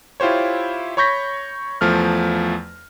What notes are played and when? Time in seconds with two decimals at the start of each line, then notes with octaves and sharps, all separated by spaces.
0.20 E4 F4 G4 C5 C#5
0.97 C#5 B5 C#6 G6 A#6 B6
1.81 E2 F3 A3 F6